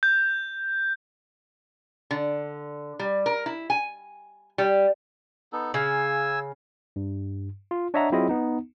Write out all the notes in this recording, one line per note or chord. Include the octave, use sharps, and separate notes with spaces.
G6
D3
G3
A#4
E4
G#5
G3
B3 D#4 A4
C#3 G#5 E6
G2
F4
D4 C#5 D#5 E5 F#5 A#5
F#3 C4 E4 F4 G#4 D#5
B3 D#4